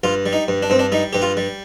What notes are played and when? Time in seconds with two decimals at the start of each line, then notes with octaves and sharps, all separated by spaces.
0.04 G2 F4
0.26 G3
0.33 D#4
0.48 G2
0.62 D4
0.70 G2 C4
0.79 D4
0.92 G3 D#4
1.13 G2 G4
1.22 F4
1.37 G3